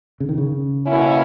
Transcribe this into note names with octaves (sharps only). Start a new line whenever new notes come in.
C#3
D#3
C#3
B2 A#3 C#4 E4